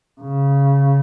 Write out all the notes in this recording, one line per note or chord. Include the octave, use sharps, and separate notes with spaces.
C#3